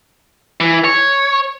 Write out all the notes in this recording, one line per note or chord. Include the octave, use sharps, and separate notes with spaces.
E3
C#5